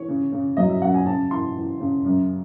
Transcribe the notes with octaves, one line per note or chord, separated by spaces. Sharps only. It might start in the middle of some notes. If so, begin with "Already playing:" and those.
Already playing: E3 C#5
C#3
C#3
F#3 D#5
E5
F#2 F#5
G#5
C#3 A5
E3 C6
E3
C#3
F#2